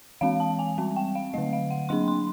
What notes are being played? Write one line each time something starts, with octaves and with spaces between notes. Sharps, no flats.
E3 G#3 C4 F5
A5
G#5
G3 C4
G5
F5
D3 F#3 A3 D#5
F5
F#5
F#3 A#3 D4 C6
C6